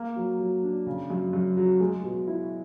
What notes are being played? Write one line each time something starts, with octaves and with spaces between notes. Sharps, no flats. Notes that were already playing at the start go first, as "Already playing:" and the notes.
Already playing: A#3
F#3
F#3
D4
C#3
F#2
F#2
F#3
G#3
B2
E4